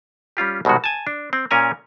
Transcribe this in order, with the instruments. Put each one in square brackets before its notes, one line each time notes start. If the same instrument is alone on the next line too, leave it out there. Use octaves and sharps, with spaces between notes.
[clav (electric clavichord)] G3 C#4 F4 G4
C2 B2 D#3 G#3 F#4
G#5 A5
D4
C4
A#2 C#4 A#4 G#5 A#5